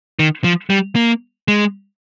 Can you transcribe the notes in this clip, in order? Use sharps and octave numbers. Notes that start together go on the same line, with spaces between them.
D#3
F3
G3
A#3
G#3